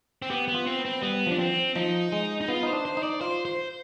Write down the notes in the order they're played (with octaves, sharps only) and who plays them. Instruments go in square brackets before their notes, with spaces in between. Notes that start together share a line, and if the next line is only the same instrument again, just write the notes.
[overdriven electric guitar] C4
[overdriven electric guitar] B3 [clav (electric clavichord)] G4
[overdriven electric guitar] B3
[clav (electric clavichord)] F4
[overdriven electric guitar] C4
[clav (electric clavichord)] B3
[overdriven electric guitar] C4
[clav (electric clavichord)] G3 [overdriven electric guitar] B3
[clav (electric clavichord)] F3 [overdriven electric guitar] D4
[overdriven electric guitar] C4
[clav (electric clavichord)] F3 [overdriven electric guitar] D#4
[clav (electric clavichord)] G#3
[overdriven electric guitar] D#4
[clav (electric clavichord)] B3 [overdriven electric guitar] F4
[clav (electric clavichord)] D#4 [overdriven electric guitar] C5
[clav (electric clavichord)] D4
[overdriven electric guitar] C5
[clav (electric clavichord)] D#4
[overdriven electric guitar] D5
[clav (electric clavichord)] F4 [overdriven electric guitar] C5
[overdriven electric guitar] C5